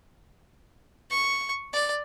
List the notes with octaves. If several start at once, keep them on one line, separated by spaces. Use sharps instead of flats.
C#6
D5